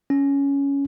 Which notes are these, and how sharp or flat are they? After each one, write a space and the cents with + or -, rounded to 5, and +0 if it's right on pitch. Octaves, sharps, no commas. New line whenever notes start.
C#4 +10